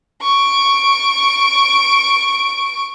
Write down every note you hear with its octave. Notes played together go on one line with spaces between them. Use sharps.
C#6 D7